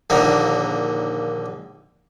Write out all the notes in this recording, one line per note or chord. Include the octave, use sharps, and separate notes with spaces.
A#1 D#2 D3 A#3